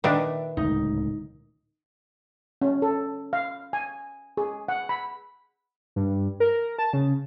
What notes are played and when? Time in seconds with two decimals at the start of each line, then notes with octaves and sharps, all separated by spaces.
0.04 A#2 D#3 D4 B4 E5
0.57 D1 C#2 D#4
2.62 C#4
2.82 A4
3.33 F5
3.73 G#5
4.37 G#4
4.68 F#5
4.89 B5
5.96 G2
6.40 A#4
6.78 A5
6.93 C#3